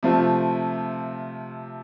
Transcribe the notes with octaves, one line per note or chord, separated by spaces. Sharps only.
C3 F3 A3 C4 F4